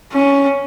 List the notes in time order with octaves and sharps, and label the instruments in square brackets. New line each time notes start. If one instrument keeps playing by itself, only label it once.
[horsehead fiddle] C#4